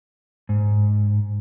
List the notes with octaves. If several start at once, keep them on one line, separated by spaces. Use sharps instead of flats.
G#2